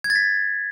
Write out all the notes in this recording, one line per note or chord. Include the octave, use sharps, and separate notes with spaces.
G#6
A6
B6